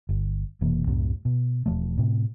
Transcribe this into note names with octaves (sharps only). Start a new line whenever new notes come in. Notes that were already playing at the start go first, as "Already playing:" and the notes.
G1
F1 B2 E3 A#3
C2 F#2 A2 C3
B2
E1 F3 A3
A2 C3